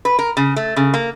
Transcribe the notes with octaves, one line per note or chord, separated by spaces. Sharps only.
B4
A#4
C#3
A3
C#3
A#3